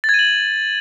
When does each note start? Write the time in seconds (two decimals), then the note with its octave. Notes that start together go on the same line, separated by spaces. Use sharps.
0.04 A6
0.09 G#6
0.14 D#7
0.19 F#7